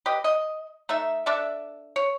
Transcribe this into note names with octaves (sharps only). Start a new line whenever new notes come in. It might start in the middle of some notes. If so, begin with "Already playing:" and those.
G4 B4 D#5
D#5
A3 D#4 E5
D4 A4 D5 E5
C#5